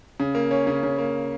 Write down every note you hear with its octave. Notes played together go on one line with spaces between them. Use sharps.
C#3
A#3
C#4
C#3
C#3
A#3